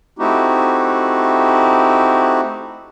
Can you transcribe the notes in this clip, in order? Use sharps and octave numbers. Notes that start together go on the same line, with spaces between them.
A3 C4 D#4 E4 F#4 G4